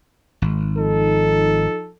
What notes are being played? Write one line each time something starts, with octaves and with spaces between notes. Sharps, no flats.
G#1
F3 D#4 A4